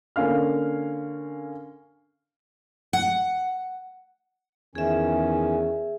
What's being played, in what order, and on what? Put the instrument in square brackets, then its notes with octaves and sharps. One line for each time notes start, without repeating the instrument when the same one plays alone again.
[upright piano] D3 A#3 C#4 F5 F6
[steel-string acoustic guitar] F#5
[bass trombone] E2 [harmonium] D#3 C#4 [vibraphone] G#4 E5